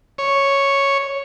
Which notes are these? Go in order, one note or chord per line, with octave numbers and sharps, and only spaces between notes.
C#5